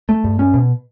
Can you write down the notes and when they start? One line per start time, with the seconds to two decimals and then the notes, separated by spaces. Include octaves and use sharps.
0.09 A3
0.24 G2
0.39 C#4
0.54 B2